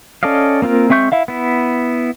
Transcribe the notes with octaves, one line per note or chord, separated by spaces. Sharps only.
C#4 A4 D5 D#5 F5
A#3 C4 F4 A#4
G#3 C4 E5 C#6 G6
E4 E5 F5
B3 E4